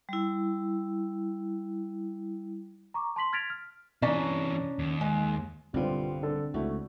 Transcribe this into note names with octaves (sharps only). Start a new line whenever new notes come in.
G3 E4
A#5 C#6 D6
A5 C6 B6 F#7
F6 G#6 A6 B6 D7 F7
F6
C3 E3 C#4 D4 A#5
D#2
G#3
C2 G2 B2 D3 G3 C4 F4
D3 D4 A4
C#2 A3 E4 F#4